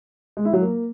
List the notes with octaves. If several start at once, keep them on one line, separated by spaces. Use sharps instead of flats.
G#3
E4
F#3
A#3